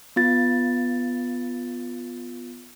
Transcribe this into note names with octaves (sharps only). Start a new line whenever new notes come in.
B3 F4 A6